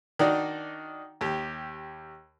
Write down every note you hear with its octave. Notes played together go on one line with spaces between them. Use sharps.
D#3 D4 D#4 F#4 D5
D#2 G4